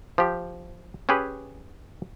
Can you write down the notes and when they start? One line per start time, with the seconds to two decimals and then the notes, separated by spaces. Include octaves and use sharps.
0.18 F3 G4
1.09 C#4 G4 G#4 B4